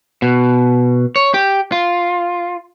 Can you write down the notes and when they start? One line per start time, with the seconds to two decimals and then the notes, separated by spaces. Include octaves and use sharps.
0.22 B2
1.16 C#5
1.34 G4
1.72 F4